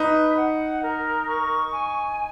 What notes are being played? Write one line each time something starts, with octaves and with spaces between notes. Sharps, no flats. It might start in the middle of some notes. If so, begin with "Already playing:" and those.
Already playing: D#4 B4
F#5
A#4
C#6
G#5